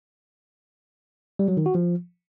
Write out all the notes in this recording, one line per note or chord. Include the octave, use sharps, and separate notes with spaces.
G3
F#3
D#3
F#4
F3